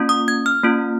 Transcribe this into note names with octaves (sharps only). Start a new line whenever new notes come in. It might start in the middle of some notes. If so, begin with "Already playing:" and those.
Already playing: A#3 C#4 F4
D#6
G#6
F6
A#3 C#4 F4